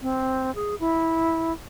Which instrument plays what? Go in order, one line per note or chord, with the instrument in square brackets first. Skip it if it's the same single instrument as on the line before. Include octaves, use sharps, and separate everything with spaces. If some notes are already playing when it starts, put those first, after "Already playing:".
[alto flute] C4
G#4
E4